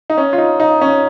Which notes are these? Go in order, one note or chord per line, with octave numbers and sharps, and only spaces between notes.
D#4
C#4
F4
D#4
D#4
C#4